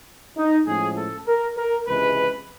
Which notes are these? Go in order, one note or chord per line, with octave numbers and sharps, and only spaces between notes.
D#4
A2 F3 G#3 C#4 G#4
A4
A#4
A#4
C#2 C3 E3 G#3 B4